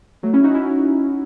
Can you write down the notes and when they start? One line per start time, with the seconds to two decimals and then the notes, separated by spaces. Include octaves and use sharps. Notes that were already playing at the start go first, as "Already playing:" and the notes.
0.23 F#3 A3
0.33 C#4 E4
0.44 D#4 F#4
0.54 C#4 E4